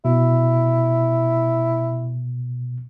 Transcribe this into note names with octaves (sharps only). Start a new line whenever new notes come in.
B2 E4